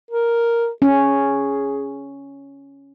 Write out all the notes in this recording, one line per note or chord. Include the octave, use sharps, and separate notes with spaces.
A#4
C#4 G#4